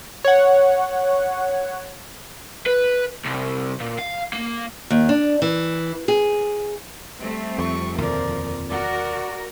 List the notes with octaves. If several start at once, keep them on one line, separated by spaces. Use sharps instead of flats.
C#5 F#5
B4
C2
A#2
F5
A#3
D#2
D4
E3
G#4
G3 A3 C4
F2 C#6
D#2 B2 D3 F3 A#4 D5
F#4 A#4 D5 F#5